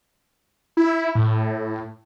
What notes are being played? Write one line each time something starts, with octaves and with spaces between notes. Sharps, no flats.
E4
A2